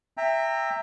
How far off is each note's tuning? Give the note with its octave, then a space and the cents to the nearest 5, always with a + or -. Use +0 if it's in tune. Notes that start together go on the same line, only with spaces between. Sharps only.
E5 +0 G5 +25 A#5 -15